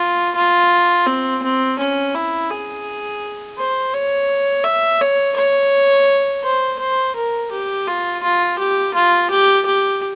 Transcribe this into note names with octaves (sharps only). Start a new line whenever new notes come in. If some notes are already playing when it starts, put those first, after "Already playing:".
Already playing: F4
F4
C4
C4
C#4
E4
G#4
C5
C#5
E5
C#5
C#5
C5
C5
A#4
G4
F4
F4
G4
F4
G4
G4